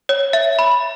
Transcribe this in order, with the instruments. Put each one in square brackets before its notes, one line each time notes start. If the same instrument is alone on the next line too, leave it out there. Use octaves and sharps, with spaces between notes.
[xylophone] C#5
E5
B5